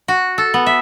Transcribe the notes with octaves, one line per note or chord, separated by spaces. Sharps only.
F#4
A4
B3
E5